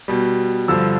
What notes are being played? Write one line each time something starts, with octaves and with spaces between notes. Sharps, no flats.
B2 G3
G2 D3 F3 E6